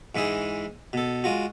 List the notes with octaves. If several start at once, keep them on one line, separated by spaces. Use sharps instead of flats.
G#2 E3 G#3 E4 G#4
B2 A4
G#3 F4 F#4